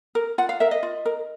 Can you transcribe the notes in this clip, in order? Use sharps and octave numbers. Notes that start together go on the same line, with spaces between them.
A#4
F4 F#5
F5
A#4 E5
D#5
F4
A#4